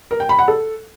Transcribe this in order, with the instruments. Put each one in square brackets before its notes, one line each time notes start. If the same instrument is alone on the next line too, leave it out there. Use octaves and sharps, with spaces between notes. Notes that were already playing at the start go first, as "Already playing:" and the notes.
[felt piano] A#4
G5
B5
F#5
A4